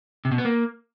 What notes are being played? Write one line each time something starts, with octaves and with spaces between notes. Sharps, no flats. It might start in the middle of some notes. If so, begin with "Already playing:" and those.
C3
B2
B3
A#3